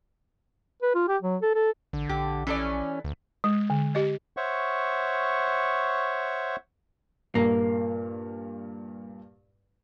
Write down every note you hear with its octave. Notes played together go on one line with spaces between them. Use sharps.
B4
F4
G4
F#3
A4
A4
A1 D3
A#1 G4
E3 C#4 A4 D5
D2
G#3
D3
G4 D#5
C5 C#5 E5 F#5 C#6
G2 A#2 A#3